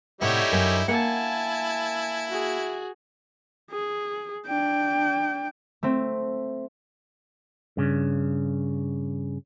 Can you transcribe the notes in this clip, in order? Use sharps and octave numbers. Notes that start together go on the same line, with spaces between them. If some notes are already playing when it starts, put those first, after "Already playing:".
A2 C3 G3 D#4 E4 A4 C#5 F#5
F#2 D4
A#3 E4 A#4 F#5 G#5 A5
F#4 G#4
G#4
D4 G5
A3 C4
G2 C#3